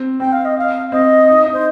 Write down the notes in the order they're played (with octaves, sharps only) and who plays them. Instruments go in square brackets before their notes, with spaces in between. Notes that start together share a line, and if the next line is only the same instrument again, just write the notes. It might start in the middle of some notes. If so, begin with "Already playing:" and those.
Already playing: [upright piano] C4
[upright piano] C4 [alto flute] G5
[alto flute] F5
D#5
F5
[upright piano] C4 [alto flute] D#5
[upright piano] D#4
D#4
[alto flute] C5